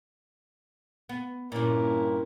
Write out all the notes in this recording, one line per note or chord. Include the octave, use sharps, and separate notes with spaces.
B3
G2 A#2 C#4 E4 A#4